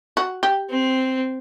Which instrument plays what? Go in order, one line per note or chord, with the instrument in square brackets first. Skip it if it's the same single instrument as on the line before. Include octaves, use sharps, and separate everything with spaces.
[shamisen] F#4
G4
[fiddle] C4